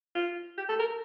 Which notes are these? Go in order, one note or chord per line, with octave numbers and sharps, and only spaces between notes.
F4
G4
A4
A#4